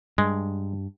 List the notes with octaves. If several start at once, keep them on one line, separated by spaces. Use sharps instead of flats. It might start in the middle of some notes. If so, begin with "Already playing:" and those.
G2 G#3